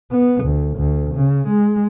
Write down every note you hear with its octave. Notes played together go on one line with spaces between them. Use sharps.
B3
D2
D2
C#3
G#3